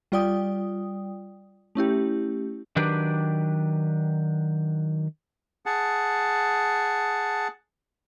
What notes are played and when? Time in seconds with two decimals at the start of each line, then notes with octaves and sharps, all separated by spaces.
0.12 G3 F4 D5 G5 D#6
1.75 A3 C#4 E4 G4
2.76 D#3 F#3 D4 G4 B4 D5
5.66 G#4 F#5 A5